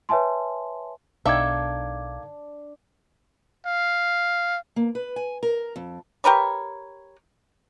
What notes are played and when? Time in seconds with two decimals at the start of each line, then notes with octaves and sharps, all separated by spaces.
0.09 B4 C#5 E5 G#5 A5 C6
1.26 B1 D#3 D4 A4 E5 F5 D6 G#6
3.66 F5
4.76 A#3
4.95 B4
5.16 G#5
5.43 A#4
5.76 F2
6.24 G4 A#4 B4 C#5